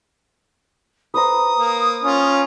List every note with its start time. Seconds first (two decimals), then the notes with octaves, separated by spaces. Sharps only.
1.14 B4 C5 A#5 D#6
1.58 A#3
2.04 C#4 F4